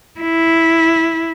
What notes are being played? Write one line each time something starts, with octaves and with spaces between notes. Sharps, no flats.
E4